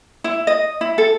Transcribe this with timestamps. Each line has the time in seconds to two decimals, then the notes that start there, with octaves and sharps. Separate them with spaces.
0.24 E4
0.47 D#5
0.81 E4
0.98 A4